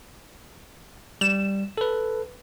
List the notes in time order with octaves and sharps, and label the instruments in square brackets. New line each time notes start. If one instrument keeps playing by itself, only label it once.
[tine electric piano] G3 [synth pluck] E7
[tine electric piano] A4 B4